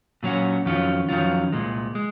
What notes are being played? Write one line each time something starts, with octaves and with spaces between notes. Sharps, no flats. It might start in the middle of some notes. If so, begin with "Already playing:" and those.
A#2 F#3 C#4 F#4
F2 D#3 F#3 C#4 F4
F2 D#3 F#3 C#4 F4
C2 A#2 G#3
G#3